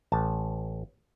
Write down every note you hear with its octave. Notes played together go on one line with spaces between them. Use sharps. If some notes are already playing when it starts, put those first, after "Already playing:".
A1 A5